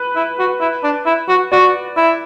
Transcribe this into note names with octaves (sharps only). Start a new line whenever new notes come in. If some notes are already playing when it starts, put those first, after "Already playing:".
Already playing: B4
E4
F#4
E4
D4
E4
F#4
F#4 D5
E4